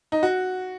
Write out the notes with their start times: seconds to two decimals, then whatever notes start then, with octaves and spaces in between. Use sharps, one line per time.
0.12 D#4
0.23 F#4